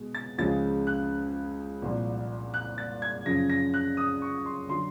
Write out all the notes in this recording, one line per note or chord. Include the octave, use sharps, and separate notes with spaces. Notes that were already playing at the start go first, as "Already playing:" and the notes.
Already playing: B2 G#3
A6
C#2 C#3 F3 G#3 A6
F#6
C2 A#2 F3
F#6
A6
G#6
F#2 C#3 F3 A#6
A#6
F#6
D#6
C#6
C6
D3 F#3 C6